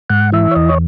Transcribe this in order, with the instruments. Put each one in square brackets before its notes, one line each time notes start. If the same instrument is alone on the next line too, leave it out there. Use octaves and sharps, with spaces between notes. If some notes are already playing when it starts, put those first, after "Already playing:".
[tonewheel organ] G#2 F#5
E3 E5
C#5
E2 D#5
C#5